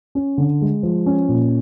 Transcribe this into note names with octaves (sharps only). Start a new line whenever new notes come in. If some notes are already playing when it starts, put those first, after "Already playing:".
C#4
D3
G#3
F3
C#4
A#2